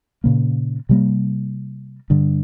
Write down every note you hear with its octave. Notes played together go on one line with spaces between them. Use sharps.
A#2 C#3 A#3
C3 G3 A#3
G2 D3